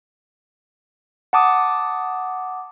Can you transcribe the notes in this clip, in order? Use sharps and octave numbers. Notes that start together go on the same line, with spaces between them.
F#5 A5 D6 D#6